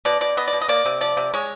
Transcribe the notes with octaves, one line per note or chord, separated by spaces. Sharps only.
B2 D5
B2 D5
B3 D#5
D5
B2
D#5
A#3 D5
C3
F3 D5
C3
G#3 C#5